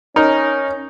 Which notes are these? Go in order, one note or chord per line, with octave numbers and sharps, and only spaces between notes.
C#4 D#4 A#4